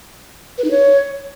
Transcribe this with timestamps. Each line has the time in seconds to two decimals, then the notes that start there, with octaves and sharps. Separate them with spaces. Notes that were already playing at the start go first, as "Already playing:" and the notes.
0.58 B4
0.64 D#4
0.71 C#5